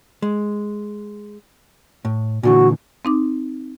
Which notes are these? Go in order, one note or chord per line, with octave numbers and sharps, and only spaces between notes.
G#3
A2
A#2 D3 E3 F#4
C4 D#4 D6